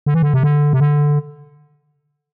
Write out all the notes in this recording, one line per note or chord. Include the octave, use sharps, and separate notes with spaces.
D3
E3
D3
C3
D3
C3
D3